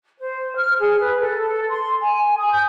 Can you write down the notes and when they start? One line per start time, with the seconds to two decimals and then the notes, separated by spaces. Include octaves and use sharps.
0.20 C5
0.57 F6
0.81 G#4
1.00 B4
1.20 A4
1.41 A4
1.69 C6
2.01 G#5
2.38 D#6
2.52 G6